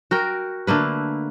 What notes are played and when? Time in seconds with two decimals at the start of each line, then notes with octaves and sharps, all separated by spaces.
0.11 F#4 A#4 G5
0.67 D3 A3 A#3 B4